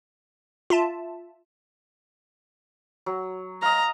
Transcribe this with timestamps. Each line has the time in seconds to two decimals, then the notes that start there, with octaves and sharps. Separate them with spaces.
0.70 F4 E5 A5
3.06 F#3
3.62 D#5 F5 A#5